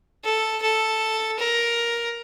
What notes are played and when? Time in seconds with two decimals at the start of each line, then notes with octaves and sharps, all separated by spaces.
0.24 A4
0.62 A4
1.39 A#4